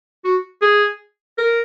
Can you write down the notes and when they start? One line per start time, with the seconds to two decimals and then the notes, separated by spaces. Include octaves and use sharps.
0.25 F#4
0.62 G#4
1.38 A#4